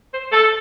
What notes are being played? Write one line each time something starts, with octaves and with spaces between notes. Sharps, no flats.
C5
A4